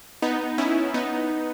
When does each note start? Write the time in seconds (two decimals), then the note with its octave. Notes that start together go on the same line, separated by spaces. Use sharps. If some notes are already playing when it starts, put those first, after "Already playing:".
0.22 B3 D#4
0.58 C#4 E4
0.94 B3 D#4